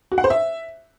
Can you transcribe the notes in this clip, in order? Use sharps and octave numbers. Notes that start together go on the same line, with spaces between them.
F#4
F#5
C5
E5